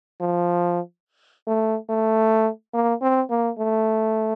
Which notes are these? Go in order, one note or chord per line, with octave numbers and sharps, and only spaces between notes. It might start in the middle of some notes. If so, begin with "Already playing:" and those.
F3
A3
A3
A#3
C4
A#3
A3